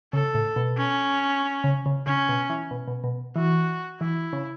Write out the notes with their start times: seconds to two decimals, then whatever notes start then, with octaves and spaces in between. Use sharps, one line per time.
0.13 C#3 A4
0.35 A2
0.56 B2
0.77 C#4
1.64 C#3
1.86 C#3
2.06 C#3 C#4
2.29 B2
2.50 E3
2.71 B2
2.88 B2
3.04 B2
3.36 E3 F#4
4.00 E3 E4
4.33 C#3